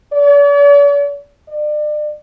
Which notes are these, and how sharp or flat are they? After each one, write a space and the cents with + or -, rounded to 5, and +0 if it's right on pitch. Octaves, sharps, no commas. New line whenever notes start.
D5 -45
D5 +35